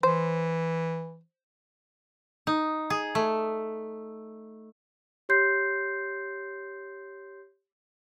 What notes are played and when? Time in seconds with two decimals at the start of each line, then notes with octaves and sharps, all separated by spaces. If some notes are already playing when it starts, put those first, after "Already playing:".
0.03 E3 C5
2.47 D#4
2.90 G#4
3.15 A3
5.29 G4 C#5 C6 G6 C7